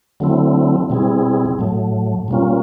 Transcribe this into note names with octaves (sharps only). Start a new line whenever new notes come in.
D3 F#3 A3 C4 E4
B2 G3 C4 E4 G#4
A2 F#3 A3
B2 G3 A#3 C#4 F4